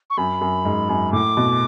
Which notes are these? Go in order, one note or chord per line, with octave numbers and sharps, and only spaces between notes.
C#6
F#2 B5
F#2
G#2
F#2
A2 D6
B2